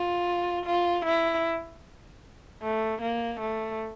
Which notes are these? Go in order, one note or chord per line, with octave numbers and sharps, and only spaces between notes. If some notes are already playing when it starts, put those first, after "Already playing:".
Already playing: F4
F4
E4
A3
A#3
A3